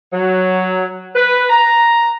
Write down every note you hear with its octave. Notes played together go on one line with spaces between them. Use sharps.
F#3
B4
A#5